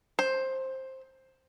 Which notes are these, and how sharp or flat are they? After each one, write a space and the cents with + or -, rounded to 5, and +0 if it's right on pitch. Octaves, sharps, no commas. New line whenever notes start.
C5 +10